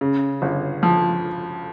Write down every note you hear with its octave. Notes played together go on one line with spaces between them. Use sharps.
C#3
G1
F3